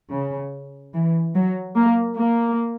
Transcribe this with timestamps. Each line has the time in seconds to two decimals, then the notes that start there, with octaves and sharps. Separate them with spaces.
0.11 C#3
0.94 E3
1.35 F#3
1.75 A#3
2.17 A#3